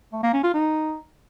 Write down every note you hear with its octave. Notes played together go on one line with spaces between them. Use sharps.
A3
A#3
C#4
F4
D#4